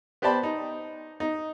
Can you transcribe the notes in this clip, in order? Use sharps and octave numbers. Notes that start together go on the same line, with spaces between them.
B3 G4 C5 D5 A5 B5
D#4
D#4